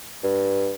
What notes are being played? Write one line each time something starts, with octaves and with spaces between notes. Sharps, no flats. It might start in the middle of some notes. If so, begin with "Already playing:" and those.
G2